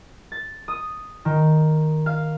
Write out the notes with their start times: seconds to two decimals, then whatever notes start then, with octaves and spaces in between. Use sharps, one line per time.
0.32 A6
0.68 D#6
1.25 D#3
2.06 F5